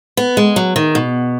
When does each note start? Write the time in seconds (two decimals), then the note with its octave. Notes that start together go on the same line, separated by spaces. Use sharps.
0.17 B3
0.37 G#3
0.56 F#3
0.76 D#3
0.95 B2